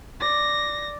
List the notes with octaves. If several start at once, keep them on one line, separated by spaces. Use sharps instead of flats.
D5 A#6